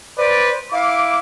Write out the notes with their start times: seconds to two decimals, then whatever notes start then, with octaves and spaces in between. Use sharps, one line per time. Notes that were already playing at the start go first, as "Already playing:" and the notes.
0.17 B4 C5 D5
0.72 E4 F5 D6